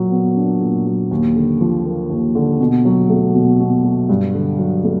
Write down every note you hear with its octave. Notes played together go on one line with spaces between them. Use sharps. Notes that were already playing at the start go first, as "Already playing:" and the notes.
Already playing: A#2 F#3
B3
D4
A#2
F#3
D#2
D3
F3
A#3
D#2
D3
B2
F#3
A3
B2
B2
F#3
G2
D3
F#3
A3